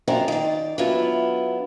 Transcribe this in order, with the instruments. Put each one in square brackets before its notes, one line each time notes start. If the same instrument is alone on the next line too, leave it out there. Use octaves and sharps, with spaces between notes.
[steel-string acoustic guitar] F#2 C4 D4 D#4 F4 A#5
D#3 D5
F#3 B3 D4 E4 F4